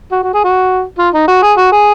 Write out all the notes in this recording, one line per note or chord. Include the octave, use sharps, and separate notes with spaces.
F#4
F#4
G#4
F#4
F4
D#4
F#4
G#4
F#4
G#4